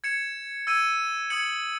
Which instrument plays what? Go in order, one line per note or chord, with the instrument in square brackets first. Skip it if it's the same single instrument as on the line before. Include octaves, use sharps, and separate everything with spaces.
[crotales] G#6 C#7 E7
E6 G#6 D#7
D#6 G#6 C#7 F#7